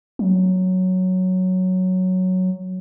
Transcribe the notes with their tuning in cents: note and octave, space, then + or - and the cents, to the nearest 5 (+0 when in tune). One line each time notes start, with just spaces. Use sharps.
F#3 +0